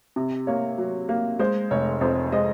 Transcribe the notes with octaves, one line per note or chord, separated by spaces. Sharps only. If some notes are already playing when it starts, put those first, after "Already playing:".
C3
A#3 C#5
F#3
A#3
G#3 C5
F1 C#5
F2 C5
G#3 C5 D#5